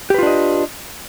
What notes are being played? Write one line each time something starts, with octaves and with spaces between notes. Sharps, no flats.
D4 F4 G4 B4 D#5